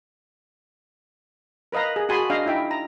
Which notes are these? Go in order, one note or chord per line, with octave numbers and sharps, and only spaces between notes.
A#4 B4 D#5 F5 A#5
G#4
F#4 G#4 G#5 A5 B5 C6
D4 D#5 F5
D#4 E4 E5 G5
A#5